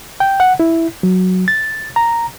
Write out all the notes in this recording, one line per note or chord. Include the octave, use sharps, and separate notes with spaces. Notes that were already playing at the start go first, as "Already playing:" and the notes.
G5
F#5
E4
F#3
A6
A#5